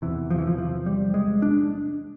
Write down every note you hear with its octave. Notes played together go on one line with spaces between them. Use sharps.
E2 C3 E3
F3
E3
F3
F3
G3
G#3
D4